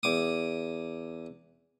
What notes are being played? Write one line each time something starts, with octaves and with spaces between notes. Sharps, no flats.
E2 D6 D#6